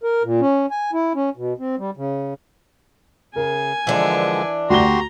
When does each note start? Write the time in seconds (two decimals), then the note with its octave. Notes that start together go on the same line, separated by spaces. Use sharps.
0.03 A#4
0.24 A#2
0.41 C#4
0.71 G#5
0.93 E4
1.15 C#4
1.37 B2
1.60 C4
1.79 G3
1.97 C#3
3.36 C#3 A#4 G#5
3.87 D3 E3 F3 G#3 D4
4.70 D2 F#4 G4 A#5 C6 G7